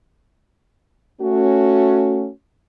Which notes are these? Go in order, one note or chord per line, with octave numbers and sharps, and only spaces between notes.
A3 C#4 F#4